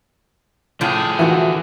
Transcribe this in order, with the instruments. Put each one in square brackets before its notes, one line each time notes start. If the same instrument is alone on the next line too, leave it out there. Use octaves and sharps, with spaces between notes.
[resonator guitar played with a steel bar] A2 F3 [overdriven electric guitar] D3 G#4
[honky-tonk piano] E3 [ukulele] F4 F#4